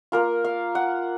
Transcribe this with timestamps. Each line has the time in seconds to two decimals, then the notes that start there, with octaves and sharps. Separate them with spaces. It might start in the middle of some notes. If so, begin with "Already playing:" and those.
0.12 A#3 F4 A#4
0.45 F5
0.75 F#5